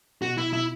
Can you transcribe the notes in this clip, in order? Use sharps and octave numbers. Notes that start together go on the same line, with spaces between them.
B2 F#4
E4
E4